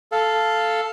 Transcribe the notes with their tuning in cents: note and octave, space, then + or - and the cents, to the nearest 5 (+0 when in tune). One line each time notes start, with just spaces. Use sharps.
A4 +0 F5 -5